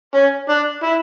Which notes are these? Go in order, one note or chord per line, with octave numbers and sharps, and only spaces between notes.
C#4
D4
E4